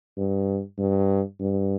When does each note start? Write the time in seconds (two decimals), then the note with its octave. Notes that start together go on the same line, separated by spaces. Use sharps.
0.17 G2
0.78 G2
1.40 G2